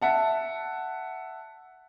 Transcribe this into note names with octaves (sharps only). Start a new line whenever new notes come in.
E5 F#5 A5